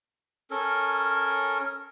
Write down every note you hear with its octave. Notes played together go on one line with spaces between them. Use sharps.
C#4 A4 A#4